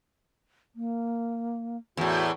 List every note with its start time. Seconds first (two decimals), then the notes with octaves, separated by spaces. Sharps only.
0.76 A#3
1.97 E2 A2 F#4